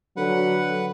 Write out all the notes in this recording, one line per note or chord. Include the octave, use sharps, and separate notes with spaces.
D3 F#3 B4 F#5